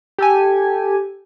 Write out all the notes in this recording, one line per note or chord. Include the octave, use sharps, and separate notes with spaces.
G4 A4 G#5